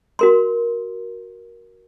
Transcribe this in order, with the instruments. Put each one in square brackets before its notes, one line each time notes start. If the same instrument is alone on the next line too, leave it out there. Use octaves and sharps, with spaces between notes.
[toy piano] F#4 A#4 C6